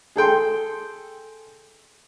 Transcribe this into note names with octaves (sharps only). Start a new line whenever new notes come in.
G#4 A4 G5 C6